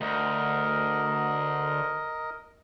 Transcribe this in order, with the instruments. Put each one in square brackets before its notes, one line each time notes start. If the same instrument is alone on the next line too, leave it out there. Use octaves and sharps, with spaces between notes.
[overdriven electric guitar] D2 [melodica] A#4 D#5